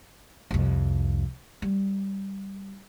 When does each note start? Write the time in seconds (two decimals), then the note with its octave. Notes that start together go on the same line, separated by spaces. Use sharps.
0.51 C2 F2
1.62 G3